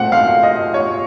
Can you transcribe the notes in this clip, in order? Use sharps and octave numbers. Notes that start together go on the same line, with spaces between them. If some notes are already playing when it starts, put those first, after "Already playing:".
Already playing: A#2 A3 C4 F#5
F5
D#5
C#5